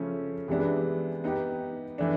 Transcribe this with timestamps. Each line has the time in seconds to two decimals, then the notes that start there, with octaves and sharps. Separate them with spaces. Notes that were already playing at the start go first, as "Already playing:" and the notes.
Already playing: C#3 F3 A3 C#4
0.48 C3 E3 G#3 B3 D4
1.24 B3 D#4 G4
1.98 E3 A3 D4